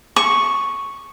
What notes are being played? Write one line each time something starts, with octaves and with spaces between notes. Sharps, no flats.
C#6